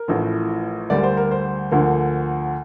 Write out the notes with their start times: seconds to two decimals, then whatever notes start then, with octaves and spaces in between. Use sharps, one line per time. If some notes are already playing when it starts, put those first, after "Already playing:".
Already playing: A#4
0.08 A1 A2 F3
0.90 D2 D3 G3 A#3 D5
1.03 C5
1.17 A#4
1.31 C5
1.71 D2 D3 F3 A#3